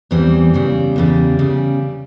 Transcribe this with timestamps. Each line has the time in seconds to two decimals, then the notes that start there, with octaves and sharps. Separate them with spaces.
0.11 E2 E3 G3 C4
0.54 E2 C#3 G3
0.96 E2 C#3 G3
1.39 C#3 G3